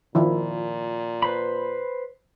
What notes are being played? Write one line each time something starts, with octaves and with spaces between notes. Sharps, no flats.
A#2 D#3 F3 E4
B4 C5 B5